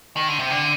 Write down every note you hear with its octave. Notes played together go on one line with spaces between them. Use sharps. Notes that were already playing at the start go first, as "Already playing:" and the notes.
D#3
D3
C3
D3